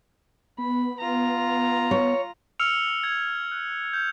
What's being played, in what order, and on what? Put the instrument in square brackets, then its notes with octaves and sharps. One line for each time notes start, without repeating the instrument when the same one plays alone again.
[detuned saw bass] B3 [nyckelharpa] B5
[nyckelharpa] F4 A#5
[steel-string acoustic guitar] C#5
[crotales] E6 F6 C#7 F7
G#6
F#6
G6